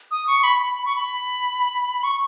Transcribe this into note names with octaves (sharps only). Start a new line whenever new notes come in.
D#6
C#6
B5
B5
B5
C#6
B5
C#6